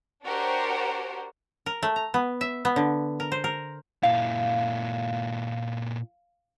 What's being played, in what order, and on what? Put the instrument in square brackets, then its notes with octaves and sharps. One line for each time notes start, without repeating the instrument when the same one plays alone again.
[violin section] D4 F#4 G4 A#4 C5 C#5
[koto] A#4
A3
A#5
B3
E5
B3
D3
A#4
C5
A#4
[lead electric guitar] A#2 E4 [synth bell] F5